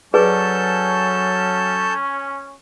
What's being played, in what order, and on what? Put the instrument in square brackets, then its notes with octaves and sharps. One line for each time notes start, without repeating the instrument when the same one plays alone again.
[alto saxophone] F#3 [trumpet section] C#4 [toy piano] G#4 B4 D5 [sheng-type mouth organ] A4 A5 G6